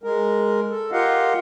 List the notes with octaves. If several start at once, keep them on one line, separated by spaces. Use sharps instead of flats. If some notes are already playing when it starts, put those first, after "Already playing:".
G#3 A#4
A4
F4 G4 A#4 D#5 F5 F#5